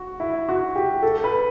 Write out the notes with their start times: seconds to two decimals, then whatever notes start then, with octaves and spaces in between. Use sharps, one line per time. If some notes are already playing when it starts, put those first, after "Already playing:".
Already playing: F#4
0.20 E4
0.49 F#4
0.76 G4
1.03 A4
1.24 B4